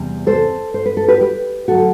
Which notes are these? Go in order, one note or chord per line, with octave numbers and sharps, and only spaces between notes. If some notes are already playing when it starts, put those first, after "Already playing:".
Already playing: E2 C3 G3
A4 C5
C5
B4
A4
G4 B4
G4 B4
D3 F#3 A3 F#4 A4